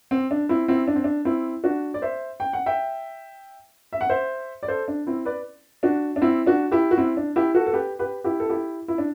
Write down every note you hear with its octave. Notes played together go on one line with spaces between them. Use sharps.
C4
D4
C4 E4
C4 E4
D4
C4
D4
C4 E4
D4 F#4
D5
C5 E5
G5
F#5
E5 G5
E5
F#5
C5 E5
D5
A4 C5
D4
C4 E4
B4 D5
D4 F#4
D4
C4 E4
D4 F#4
E4 G4
F#4
C4 E4
D4
E4 G4
F#4 A4
A4
G4 B4
G4 B4
E4 G4
A4
E4 G4
E4
D4